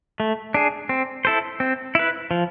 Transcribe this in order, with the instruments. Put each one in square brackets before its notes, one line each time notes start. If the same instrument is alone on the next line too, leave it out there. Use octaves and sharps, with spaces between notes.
[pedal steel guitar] A3
D4 G#4
C4
E4 A4 C5
C4
E4 B4
F3